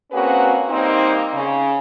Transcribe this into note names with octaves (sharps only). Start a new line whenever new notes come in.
A#3 C4 C#4 F#4 G#4 B4
G3 A#3 C4 D#4
C#3